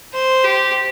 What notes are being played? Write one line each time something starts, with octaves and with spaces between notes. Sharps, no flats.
C5
G4